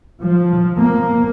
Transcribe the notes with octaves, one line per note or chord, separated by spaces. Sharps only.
F3
A#3